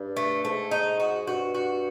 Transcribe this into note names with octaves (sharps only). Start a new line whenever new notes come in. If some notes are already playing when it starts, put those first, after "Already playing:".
Already playing: G2
A3
G#2 A3
D#4
F#4
G2 F#4
F#4